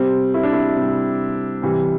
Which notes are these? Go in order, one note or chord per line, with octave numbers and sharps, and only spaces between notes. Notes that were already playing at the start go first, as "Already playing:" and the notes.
Already playing: C3 G3 C4
E4
D4
E4
C3 G3
C3 E3 G3